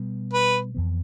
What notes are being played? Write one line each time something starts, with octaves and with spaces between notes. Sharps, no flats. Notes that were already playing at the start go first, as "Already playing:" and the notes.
Already playing: B2 G3 B3
B4
F2 E3 B3